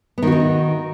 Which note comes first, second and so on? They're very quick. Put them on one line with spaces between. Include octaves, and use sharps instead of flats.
B3 D#3 F#4 D#4